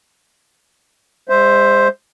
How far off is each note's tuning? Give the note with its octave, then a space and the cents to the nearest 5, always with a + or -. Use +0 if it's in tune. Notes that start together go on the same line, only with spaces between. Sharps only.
G#3 -40 C5 +0 E5 +0